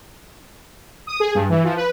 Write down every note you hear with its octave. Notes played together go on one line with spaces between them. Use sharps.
D#6
G#4
G2
E3
F3
B4